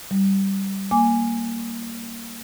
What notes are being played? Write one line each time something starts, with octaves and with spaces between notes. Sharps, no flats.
G3
A#3 G#5 D6